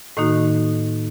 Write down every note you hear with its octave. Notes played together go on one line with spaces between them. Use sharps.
A2 D#3 A#3 D#4 F#4